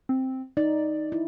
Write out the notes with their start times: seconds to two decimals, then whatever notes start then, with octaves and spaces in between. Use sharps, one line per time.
0.09 C4
0.57 D#4 D5
1.12 E4